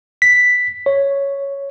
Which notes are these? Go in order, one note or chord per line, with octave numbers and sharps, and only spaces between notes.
B6
C#5